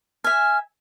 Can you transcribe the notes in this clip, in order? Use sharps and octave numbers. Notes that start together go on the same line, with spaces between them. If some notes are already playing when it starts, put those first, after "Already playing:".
E5 G#5 F6